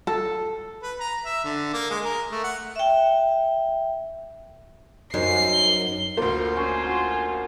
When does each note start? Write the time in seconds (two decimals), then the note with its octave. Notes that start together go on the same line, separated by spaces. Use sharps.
0.07 A4
0.83 B4
1.00 A#5
1.25 E5
1.45 D3
1.73 A#3
1.90 G#3
2.05 A#4
2.31 A3
2.44 F#5
2.76 E5 G5
5.14 F#2 D#4 C5 C7
5.53 G7
6.17 D2 A#3 F4 C5 C6
6.57 C#4 F4 C5 G#5
6.87 F#4